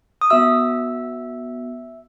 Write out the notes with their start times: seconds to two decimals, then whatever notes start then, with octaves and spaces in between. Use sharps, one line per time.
0.21 D#6
0.30 B3 F#4 E5 E6